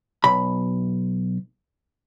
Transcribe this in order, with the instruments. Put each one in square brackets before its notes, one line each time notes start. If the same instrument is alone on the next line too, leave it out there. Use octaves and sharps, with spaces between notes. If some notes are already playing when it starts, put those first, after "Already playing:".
[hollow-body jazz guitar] B1 B5